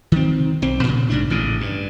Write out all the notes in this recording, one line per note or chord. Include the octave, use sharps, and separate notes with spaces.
D#3 C4
B1 C4
A#2 C#3
A#1 G#2 D4
A1 A2 C#3
G2